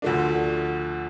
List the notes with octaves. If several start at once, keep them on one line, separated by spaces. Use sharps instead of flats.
D2 D3 F3 A3 D4